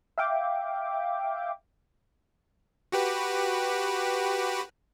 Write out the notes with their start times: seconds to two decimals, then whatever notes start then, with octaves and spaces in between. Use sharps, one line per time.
0.18 E5 F5 G5 D6
2.92 F#4 G4 B4